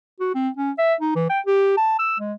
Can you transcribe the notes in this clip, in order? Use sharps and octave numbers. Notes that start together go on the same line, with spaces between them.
F#4
C4
C#4
E5
D#4
E3
G5
G4
A5
E6
G#3